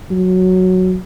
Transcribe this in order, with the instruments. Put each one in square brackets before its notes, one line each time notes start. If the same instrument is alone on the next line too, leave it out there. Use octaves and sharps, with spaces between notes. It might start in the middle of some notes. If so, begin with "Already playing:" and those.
[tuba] F#3